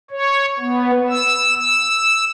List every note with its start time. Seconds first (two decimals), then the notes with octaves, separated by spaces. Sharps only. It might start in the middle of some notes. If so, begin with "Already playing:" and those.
0.11 C#5
0.59 B3
1.10 E6
1.56 E6